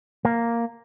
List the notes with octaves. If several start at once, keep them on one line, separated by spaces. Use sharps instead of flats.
A#3